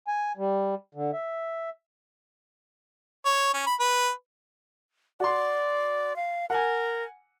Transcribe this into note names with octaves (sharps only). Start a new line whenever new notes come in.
G#5
G3
D3
E5
C#5
C#4
B5
B4
F#4 D5 C6
F5
A#4 F#5 G#5